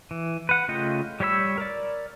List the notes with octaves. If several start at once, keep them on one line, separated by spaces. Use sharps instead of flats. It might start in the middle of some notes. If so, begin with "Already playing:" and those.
E3
B4 F#5
C#3 A3 F4 D#5 G5
G3 G4 C#5 B5 E6
A#4 D5